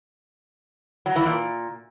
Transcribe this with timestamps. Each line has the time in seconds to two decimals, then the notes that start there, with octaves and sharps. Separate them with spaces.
1.06 F#3
1.16 E3
1.26 A#2